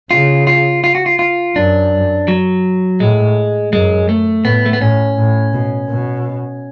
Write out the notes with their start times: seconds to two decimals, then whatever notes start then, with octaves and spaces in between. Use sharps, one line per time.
0.11 C#3 F4
0.47 F4
0.84 F4
0.95 F#4
1.06 F4
1.19 F4
1.56 F#2 D4
2.28 F#3
3.00 A2 G#3
3.73 F#2 G#3
4.09 A3
4.45 A2 B3
4.66 A3
4.73 B3
4.81 A2 C#4
5.17 A2
5.53 B2
5.89 B2